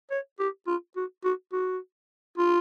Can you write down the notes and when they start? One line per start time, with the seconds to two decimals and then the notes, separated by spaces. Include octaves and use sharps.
0.11 C#5
0.39 G4
0.67 F4
0.96 F#4
1.24 F#4
1.53 F#4
2.38 F4